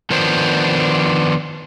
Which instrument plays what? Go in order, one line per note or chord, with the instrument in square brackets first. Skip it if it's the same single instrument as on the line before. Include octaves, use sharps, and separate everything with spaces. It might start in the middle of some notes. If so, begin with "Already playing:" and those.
[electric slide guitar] D#3 F3 B3 D4 C5